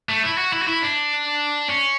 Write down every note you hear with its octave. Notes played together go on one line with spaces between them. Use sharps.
A3
E4
F#4
E4
F#4
E4
D4
C#4